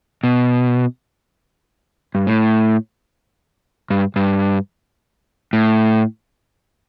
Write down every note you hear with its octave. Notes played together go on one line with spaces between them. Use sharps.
B2
G2
A2
G2
G2
A2